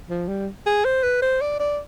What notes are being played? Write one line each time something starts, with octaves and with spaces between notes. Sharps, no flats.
F3
G3
G#4
C5
B4
C5
D5
D5